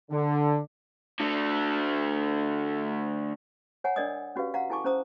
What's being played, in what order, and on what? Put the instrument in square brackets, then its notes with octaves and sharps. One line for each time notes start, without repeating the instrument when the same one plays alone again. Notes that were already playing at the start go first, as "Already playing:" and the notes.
[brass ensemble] D3
[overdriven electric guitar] D3 A3
[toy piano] C#5 F#5 G#5 A#5
D4 A#4 D5 D#5 D#6
C#4 F#4 G4 B4 F5
F5 F#5 A#5
E4 A4 G#5 A5 C#6 D6
C#4 C5 A#5 D#6